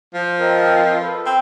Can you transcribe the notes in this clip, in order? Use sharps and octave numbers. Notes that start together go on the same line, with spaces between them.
F3
C4 A#4 D#5
A4 B4
C4